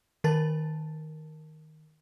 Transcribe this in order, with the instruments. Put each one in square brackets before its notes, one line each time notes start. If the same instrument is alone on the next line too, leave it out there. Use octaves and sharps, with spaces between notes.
[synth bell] D#3 A#4 A5 A6